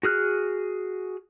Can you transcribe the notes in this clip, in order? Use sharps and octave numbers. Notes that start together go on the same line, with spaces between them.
F#4 G#4 F6 F#6